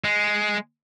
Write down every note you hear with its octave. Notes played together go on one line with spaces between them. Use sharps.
G#3